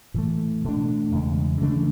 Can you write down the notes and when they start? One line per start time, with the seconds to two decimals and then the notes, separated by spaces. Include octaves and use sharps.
0.14 A2 E3 A3
0.64 B2 A3 D4
1.12 E2 C#3 G#3
1.61 C#3 E3 A3 D4